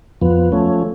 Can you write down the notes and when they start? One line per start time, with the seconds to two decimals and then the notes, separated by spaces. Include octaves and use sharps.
0.22 F2 F3 B3
0.52 F3 A3 C#4